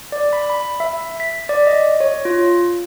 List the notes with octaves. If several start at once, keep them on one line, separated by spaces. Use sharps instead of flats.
D5
B5
B5
E5
B6
D5
D#5
C#5
F4